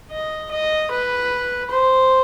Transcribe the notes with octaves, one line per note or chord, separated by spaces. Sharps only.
D#5
D#5
B4
C5